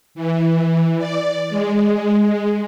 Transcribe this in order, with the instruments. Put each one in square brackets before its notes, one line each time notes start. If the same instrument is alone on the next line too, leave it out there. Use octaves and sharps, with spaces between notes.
[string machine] E3
D5
G#3